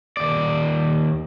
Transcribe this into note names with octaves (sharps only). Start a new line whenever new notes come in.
D#2 D5